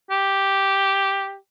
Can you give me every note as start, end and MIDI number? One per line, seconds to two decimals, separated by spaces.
0.10 1.36 67